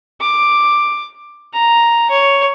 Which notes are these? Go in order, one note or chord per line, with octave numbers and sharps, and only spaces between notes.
D6
A#5
C#5